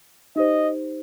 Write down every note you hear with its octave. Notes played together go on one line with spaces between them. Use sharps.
D#4 G4 C5 D#5